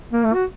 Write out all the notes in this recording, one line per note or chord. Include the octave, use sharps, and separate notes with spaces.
A#3
A3
F#4